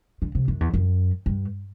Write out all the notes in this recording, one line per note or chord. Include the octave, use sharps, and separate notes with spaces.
D3
C3
F#2
E2
F#2
G2